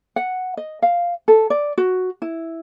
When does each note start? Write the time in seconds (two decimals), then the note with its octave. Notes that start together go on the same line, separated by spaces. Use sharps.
0.16 F#5
0.57 D#5
0.82 F5
1.28 A4
1.50 D5
1.78 F#4
2.22 E4